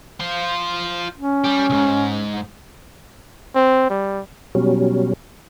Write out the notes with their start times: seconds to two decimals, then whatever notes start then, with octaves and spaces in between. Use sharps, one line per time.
0.20 F4 C5
1.17 C#4
1.44 G3 G4
1.70 C2 G#2
3.55 C4
3.90 G3
4.55 B2 F#3 G3 C#4